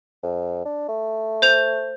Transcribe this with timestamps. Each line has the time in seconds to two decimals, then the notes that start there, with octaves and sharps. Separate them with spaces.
0.23 F2
0.65 D4
0.89 A3
1.42 C5 G6 F7